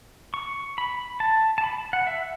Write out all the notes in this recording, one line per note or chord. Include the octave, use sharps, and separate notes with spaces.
C#6
B5
A5
A5
B5
F#5
E5